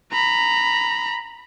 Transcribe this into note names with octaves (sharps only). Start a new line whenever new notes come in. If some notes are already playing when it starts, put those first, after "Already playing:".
A#5 B5